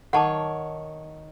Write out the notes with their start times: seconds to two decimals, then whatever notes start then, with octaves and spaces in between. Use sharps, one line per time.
0.13 D#3 C#5 F#5 A5 D6